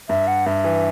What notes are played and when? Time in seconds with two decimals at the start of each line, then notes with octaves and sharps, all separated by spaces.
0.09 G2 E5
0.27 F#5
0.46 G2 E5
0.64 E3